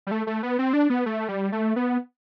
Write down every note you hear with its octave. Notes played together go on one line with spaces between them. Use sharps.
G3
A3
A3
B3
C4
D4
B3
A3
G3
A3
B3